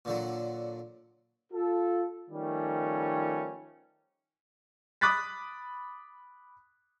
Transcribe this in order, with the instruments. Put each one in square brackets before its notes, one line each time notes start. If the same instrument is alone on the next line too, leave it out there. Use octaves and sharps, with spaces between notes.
[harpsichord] A#2 D3 F#3
[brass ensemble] F4 A4
D#3 F3 G3 A3 C#4
[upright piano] B5 D6 D#6 F#6 A6 B6